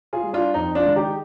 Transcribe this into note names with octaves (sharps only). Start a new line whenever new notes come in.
F4 G#4
G3
D4 F4
F2 D#4
D4 F4
D#3 G#3
D#4 G4